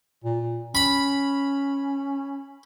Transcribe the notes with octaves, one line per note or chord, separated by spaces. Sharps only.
A#2
C#4 B5